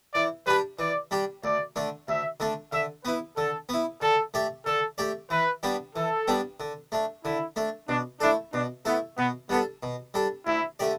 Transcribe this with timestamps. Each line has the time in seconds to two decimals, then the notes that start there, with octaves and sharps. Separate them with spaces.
0.14 E3 D5
0.47 G3 D4 G4 B4
0.79 E3 D5
1.11 G3 D4 G4
1.44 D2 D5
1.76 D3 A3 D4
2.08 D2 E5
2.40 D3 A3 D4
2.72 D3 E5
3.05 B3 E4 B4
3.37 D3 A4
3.69 B3 E4
4.02 D3 A4
4.34 A3 G4 D5
4.66 D3 A4
4.98 A3 G4 D5
5.30 E3 B4
5.63 G3 B3 D4 G4
5.96 E3 A4
6.28 G3 B3 D4 G4
6.60 D3
6.92 A3 D4
7.25 D3 E4
7.56 A3 D4
7.89 B2 D4
8.20 A3 D4 E4 A4
8.53 B2 D4
8.85 A3 B3 E4 A4
9.18 B2 B3
9.49 G3 B3 D4 A4
9.83 B2
10.14 G3 D4 A4
10.46 D2 E4
10.79 D3 A3 G4 D5